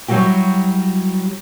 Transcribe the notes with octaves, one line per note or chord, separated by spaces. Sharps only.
F#3 G3 E4 F#4 G4